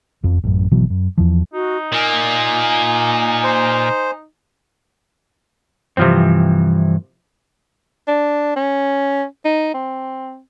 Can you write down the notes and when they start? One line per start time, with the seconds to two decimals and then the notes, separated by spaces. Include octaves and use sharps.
0.23 E1 F2
0.44 A1 F#2
0.71 G#1 B2 E3 F#3
0.90 F#2
1.18 E2 E3 F3
1.53 D#4 F#4
1.92 A#2 A#3 G#5
3.44 C5
5.97 G2 C3 E3 F3 C4
8.08 D4
8.56 C#4
9.45 D#4
9.74 C4